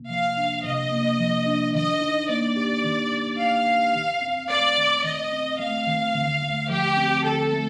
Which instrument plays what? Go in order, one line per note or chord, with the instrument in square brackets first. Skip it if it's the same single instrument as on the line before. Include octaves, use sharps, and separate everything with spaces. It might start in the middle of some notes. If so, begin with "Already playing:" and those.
Already playing: [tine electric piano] C3 A#3
[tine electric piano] F3 [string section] F5
[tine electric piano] D4
[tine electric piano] C3 [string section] D#5
[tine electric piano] A#3
F3
D4
[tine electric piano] D#3 [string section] D#5
[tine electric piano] D#4
[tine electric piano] A#3 [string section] D5
[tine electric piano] G4
D#3
D#4
[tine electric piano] A#3 [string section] F5
[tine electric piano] G4
D#3
C4
[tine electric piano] A3 [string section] D5
[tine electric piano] D#3
[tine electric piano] D#3 [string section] D#5
[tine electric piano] C4
[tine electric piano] A3 [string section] F5
[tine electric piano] D#3
D3
A3
[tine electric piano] F3 [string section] G4
[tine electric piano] C4
[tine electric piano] D3 [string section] A4
[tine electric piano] A3